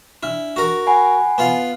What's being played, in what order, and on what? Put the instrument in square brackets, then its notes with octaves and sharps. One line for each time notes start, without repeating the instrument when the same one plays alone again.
[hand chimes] D4 F6 [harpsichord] E4
[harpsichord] F#4 A#4
[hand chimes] F#5 G#5 B5
[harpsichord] B3 F4 F5